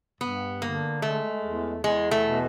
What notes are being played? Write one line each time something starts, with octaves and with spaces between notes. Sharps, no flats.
G2 B3
D3 A#3
G#3 A3
E2
E2 G#3
A3
B2